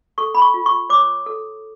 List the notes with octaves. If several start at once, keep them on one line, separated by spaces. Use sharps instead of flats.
A4 C#6
B5
C#6
F4
C#6
C#5 D6
A4